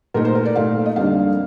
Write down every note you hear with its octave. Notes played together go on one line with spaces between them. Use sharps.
A#2 A3 D#4 A#4
C5
A#4
D5
A#2 A3 D#4 F5
D#5
F2 D3 G3 A#3 D4 F5